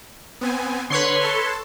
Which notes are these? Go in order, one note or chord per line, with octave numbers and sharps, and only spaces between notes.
B3 C4 G#5
D3 B4 C#5 C6
A4 A5